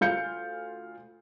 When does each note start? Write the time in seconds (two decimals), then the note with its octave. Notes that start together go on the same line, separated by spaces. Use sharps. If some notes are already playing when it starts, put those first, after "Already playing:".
0.01 D2 F4 F5 G6 C#7